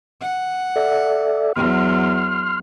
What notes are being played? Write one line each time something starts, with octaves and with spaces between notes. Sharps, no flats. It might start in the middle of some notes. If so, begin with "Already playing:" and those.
F#5
A4 D5 E5
E2 F#3 C6 F6